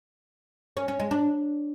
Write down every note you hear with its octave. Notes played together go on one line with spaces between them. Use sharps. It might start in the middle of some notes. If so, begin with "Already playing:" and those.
C#4
C#4
G#3
D4